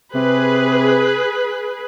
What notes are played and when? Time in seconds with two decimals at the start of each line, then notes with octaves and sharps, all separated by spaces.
0.15 C3 G#4 B4